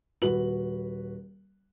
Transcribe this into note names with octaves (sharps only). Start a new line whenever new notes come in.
D#1 F#4 B4 F#7